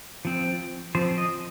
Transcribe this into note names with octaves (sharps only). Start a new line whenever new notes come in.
F3 C4
F3 C4 C5
D#5